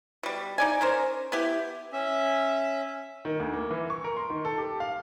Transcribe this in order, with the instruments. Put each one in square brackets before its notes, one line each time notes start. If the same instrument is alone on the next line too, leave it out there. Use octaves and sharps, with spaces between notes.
[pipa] B2 G3
D#4 D5 G#5
C#4 A#4 C5
B3 E4 G4
[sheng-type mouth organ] C#4 E5
[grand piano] D#3
D2
A#3
E3
C#6
A#4
C6
D#3
A4
G4
F5